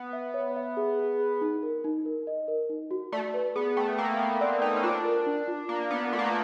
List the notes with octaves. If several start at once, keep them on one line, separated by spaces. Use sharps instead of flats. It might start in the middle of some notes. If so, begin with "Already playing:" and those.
Already playing: B3
E5
C#5
E5
G#4
G#4
G#4
D#4
A#4
D#4
A#4
D#5
A#4
D#4
F#4
A3 D5
B4
B3 G#4
A3 G5
A#3 G5
B3 G5
C4 D5
D#4 G5
C#4
D4 F4
A#4
D4
F4
A#3 F4
B3 D4
A3 F4
A#3
A3